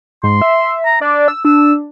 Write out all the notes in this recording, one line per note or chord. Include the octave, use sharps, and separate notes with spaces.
G#2 C6
E5
A#5
D4 D5
E6
D4 E6